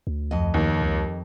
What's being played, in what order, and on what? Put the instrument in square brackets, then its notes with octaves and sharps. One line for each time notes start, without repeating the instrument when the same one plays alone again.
[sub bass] D2
[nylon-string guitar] F2 D#5
[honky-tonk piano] D#2
[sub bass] C#2